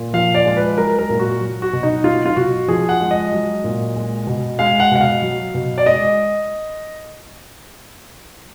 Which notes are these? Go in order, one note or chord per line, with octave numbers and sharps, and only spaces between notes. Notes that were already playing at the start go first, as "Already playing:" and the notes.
Already playing: A#2
F3 F5
D5
G#3
B4
F#3 A#4
A#4
A#2
F#4
F#3
F#4
B2
D#4
F#3 F4
F4
B2 F#4
F3 G#4
F#5
G#3
D#5
F#3
A#2
G#3
B2
G#3 F5
F#5
B2 F#5
F5
F#3
B2
D5
G#3 D#5